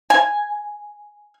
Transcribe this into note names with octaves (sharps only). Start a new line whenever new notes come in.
G#5